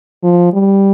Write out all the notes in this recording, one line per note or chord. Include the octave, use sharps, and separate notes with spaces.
F3
G3